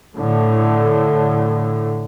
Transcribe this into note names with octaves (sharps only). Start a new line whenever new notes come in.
A2 D3